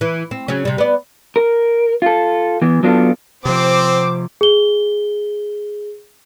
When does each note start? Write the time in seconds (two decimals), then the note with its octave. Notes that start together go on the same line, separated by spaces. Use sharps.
0.01 E3
0.31 C4
0.48 C#3 F#3 C#4
0.65 C3 G3
0.78 B3 D5
1.36 A#4
2.02 F4 A4
2.62 E3 B3
2.83 F#3 B3 D4 F4 G4 A4
3.45 C3 F3 C4 C5 D6
4.41 G#4 G7